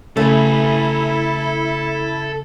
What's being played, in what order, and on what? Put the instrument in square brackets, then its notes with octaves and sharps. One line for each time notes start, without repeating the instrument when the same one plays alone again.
[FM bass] C#3 [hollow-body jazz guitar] A3 [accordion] E4 E5 [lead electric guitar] A4 G#5